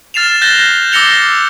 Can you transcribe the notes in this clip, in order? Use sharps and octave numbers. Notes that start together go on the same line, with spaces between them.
F6 A6 C7 E7 F7
F#6 G6 A6 A#6 E7 G7
D6 E6 A#6 C#7 F7 G7